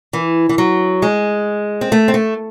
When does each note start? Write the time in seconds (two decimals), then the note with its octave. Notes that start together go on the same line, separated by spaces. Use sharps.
0.13 E3
0.49 E3
0.58 F#3
1.02 G#3
1.81 C4
1.92 A3
2.08 C4
2.14 A3